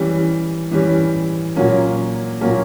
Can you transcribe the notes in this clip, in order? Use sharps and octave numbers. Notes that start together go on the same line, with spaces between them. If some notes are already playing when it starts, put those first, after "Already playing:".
Already playing: E3 G3 C#4 G4
E3 G3 C#4 G4
A#2 F#3 A#3 C#4
A#2 F#3 A#3 C#4